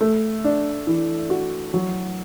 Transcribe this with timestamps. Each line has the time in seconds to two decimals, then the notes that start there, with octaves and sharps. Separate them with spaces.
0.01 A3
0.44 D4
0.87 E3
1.30 F#4
1.74 F#3